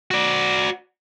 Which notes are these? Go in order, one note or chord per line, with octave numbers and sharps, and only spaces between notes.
F#4 D5